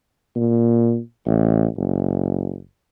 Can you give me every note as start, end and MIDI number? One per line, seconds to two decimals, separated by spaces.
0.36 0.99 46
1.26 1.66 33
1.77 2.60 30